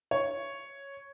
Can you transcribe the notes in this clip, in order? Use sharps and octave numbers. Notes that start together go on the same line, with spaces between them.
C#5